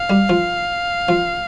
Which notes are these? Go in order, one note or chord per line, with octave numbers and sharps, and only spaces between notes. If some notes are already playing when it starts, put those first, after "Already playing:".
Already playing: F5
G3
F3
F3